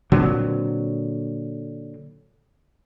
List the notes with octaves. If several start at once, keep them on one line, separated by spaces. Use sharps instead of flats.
A#2 D3 F#3 C4